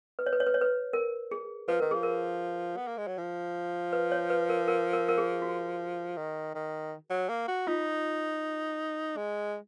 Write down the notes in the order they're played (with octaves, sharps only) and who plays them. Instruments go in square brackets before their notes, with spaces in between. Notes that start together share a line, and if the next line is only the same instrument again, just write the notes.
[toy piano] B4
C#5
B4
C#5
B4
C#5
B4
A#4
G#4
[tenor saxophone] F3 [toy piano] B4
[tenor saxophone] D#3 [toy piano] A#4
[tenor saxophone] F3 [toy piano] G#4
[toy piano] A#4
[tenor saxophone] B3
A#3
G#3
F#3
F3
[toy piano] B4
C#5
B4
A#4
A#4
A#4
A#4
G#4
F#4
[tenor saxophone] D#3
D#3
F#3
A#3
F#4
[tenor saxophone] D#4 [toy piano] F4
[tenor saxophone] G#3